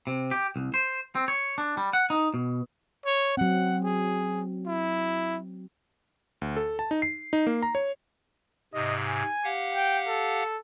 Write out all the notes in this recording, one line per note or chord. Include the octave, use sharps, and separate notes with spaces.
C3
G4
C2
C5
C4
C#5
D4
G3
F#5
D#4
B2
C#5
F#3 C4 F#5
G#4
E4
D2
A4
A5
D#4
C7
D#4
A#3
A#5
C#5
G#2 C3 D#5
G#5
G4 F5 F#5
G5
A4